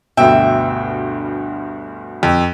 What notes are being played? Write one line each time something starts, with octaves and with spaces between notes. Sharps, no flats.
D2 G2 B2 E5 G5
F2